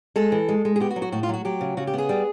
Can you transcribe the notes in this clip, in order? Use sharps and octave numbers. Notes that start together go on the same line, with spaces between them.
G#3 A4
E3
G#3
G#3
G#4
B3 G4
F#4
F#3
F#4
A2 F#4
F4
F#3 F#4
F#3 G4
C#3
C#3 F#4
G4
B3 G#4
G3